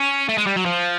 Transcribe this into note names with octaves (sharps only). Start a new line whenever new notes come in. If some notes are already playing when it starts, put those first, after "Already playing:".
Already playing: C#4
A3
G#3
G3
F#3
F3